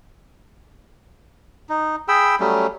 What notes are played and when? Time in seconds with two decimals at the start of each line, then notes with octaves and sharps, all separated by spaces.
1.69 D#4
2.08 G#4 G5 B5 E6
2.40 F#3 G3 A3 C#4